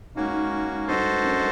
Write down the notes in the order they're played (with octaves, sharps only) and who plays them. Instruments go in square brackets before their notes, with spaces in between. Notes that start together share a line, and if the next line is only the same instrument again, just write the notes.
[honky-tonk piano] G#2 [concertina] A#3 C#4 F#4
[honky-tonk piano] G2 [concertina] F#4 A4 C5 D#5
[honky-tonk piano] F#2